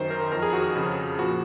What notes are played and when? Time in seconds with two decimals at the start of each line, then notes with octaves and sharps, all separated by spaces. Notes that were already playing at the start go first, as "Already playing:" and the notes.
Already playing: F#2 D#3 C5
0.10 A#4
0.32 F2 D#3 A#4
0.42 G#4
0.53 F#4
0.63 G#4
0.75 F2 C#3 F3
1.19 A#2 F3 F#4